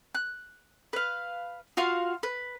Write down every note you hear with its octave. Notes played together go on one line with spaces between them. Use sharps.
F#6
B4 F5
F4 F#4 F5 C6
B4